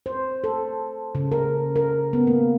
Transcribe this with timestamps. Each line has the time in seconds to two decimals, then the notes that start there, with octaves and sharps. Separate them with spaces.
0.06 C5
0.44 A4
1.15 C#3
1.32 A#4
1.76 A#4
2.13 B3
2.27 A#3